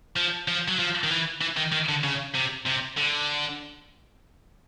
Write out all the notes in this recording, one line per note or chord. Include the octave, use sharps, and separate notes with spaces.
F3
F3
F#3
F3
D#3
E3
E3
D#3
D#3
D3
C#3
C3
C3
D3